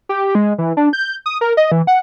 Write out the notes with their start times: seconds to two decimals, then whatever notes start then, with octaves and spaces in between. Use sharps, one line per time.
0.09 G4
0.35 G#3
0.58 E3
0.77 D4
0.93 G6
1.26 D#6
1.41 A#4
1.57 D#5
1.72 E3
1.87 F#5